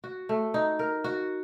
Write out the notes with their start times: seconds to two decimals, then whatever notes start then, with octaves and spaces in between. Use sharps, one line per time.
0.04 F#4
0.29 A3
0.54 D#4
0.79 A#4
1.04 F#4